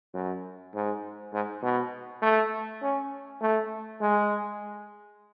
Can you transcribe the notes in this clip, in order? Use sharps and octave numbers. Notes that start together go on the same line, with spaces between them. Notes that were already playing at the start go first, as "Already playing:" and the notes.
F#2
G#2
G#2
B2
A3
C#4
A3
G#3